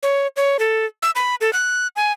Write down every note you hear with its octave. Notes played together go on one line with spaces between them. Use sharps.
C#5
C#5
A4
E6
B5
A4
F#6
G#5